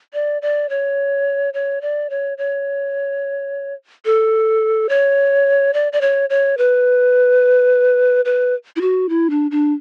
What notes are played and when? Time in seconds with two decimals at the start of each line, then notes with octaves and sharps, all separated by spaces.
0.13 D5
0.42 D5
0.69 C#5
1.54 C#5
1.81 D5
2.10 C#5
2.38 C#5
4.05 A4
4.89 C#5
5.74 D5
5.93 D5
6.01 C#5
6.30 C#5
6.58 B4
8.25 B4
8.76 E4
8.81 F#4
9.09 E4
9.30 D4
9.51 D4